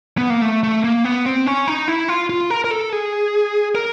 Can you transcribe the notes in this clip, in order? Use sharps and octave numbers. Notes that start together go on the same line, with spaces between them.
B3
A#3
A3
A3
A#3
B3
C4
C#4
D#4
E4
F4
F4
A#4
A#4
A4
G#4
A#4